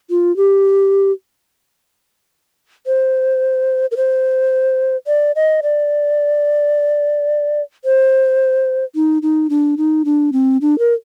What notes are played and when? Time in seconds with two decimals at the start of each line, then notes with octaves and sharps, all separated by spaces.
0.10 F4
0.37 G4
2.87 C5
3.91 A#4
3.97 C5
5.07 D5
5.36 D#5
5.63 D5
7.85 C5
8.95 D#4
9.22 D#4
9.50 D4
9.78 D#4
10.05 D4
10.33 C4
10.61 D4
10.79 A#4